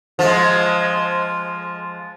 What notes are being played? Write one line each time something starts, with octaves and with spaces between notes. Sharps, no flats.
F3 G#3